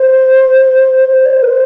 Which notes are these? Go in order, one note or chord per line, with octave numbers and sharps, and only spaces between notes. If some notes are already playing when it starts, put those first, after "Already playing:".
Already playing: C5
C5
D5
C5
A#4
C5